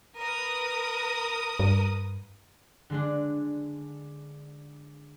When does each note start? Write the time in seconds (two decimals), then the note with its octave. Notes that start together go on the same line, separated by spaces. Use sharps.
0.19 A#4 B4 D#6
1.59 G2
2.90 D3 G#3 D4